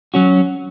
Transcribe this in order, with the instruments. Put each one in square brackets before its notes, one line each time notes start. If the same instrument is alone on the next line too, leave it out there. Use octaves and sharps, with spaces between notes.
[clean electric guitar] F#3 C#4 F#4